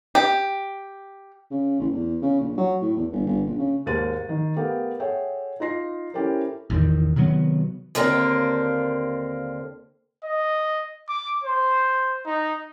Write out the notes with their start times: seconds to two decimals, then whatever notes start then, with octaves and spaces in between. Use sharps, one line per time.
0.15 G4
1.51 C#3
1.80 A1
1.93 E2
2.22 C#3
2.40 A#1
2.58 F#3
2.81 A2
2.96 E2
3.12 G1
3.27 G1
3.46 A#1
3.58 C#3
3.86 D#2 G#2 A#4 A6 D#7
4.29 D#3
4.56 A3 B3 G4 A4 A#4 F5
5.00 G#4 A4 C#5 E5 F#5 G5
5.60 D#4 F4 A#6 C7
6.14 C#4 E4 G4 A4 A#4 C5
6.70 A1 E2 D#3
7.16 C3 D#3 F#3 B3
7.95 D#2 D3 A#3 C4 D4 G4
10.24 D#5
11.09 D6
11.44 C5
12.26 D#4